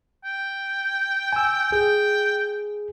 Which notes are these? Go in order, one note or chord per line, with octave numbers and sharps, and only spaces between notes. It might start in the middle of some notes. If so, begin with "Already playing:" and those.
G5
G#5 E6
G#4 G5